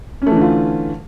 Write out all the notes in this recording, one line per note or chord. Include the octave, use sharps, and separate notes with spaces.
D3 E3 A3 C#4 F4